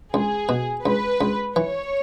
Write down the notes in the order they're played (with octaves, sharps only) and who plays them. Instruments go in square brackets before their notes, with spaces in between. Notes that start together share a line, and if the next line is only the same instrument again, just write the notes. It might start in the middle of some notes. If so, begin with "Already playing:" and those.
[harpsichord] C#2 [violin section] G#4
[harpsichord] B2
[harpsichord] C#2 [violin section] B4
[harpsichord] C#2
[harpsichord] E3 [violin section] C#5